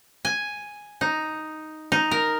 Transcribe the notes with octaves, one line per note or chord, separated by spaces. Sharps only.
G#5
D#4
D#4
A#4